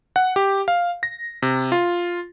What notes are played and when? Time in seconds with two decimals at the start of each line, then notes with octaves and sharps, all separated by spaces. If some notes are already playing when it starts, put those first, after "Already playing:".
0.16 F#5
0.36 G4
0.68 F5
1.03 A#6
1.42 C3
1.72 F4